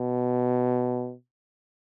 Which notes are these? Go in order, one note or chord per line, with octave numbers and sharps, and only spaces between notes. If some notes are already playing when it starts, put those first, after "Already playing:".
Already playing: B2